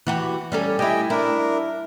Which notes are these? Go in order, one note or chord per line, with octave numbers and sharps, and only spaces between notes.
E3 F#4 G4
G3 C#4 A4
E4 G4 D#5 G5 G#5
D4 E4 A#4